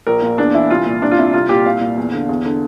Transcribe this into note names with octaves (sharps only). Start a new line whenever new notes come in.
A#1 A#4
A#2
E2 D4
E3 E4
C2 F4
A#2
C2 D4
F4
C3 E4
C2 F4
A#2 G4
C2 F5
A#2
E2
D3
E2
D3